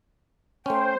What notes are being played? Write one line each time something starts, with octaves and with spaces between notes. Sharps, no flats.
A3 C#4 C5 G5